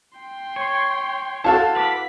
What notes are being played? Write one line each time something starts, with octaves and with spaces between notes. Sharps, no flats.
G5 C6
C#5
E4 F#4 A4 F5 A5
B4 B5 D6 B6